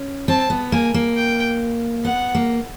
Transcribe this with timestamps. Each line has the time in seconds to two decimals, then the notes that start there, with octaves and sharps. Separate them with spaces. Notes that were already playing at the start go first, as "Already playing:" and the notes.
Already playing: C#4
0.28 C4 A5
0.50 B3
0.72 A#3 G#5
0.94 A#3
1.16 G5
2.04 B3 F#5
2.35 A#3